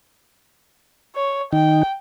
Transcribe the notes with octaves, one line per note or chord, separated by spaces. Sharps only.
C#5
D#3 D#4 G5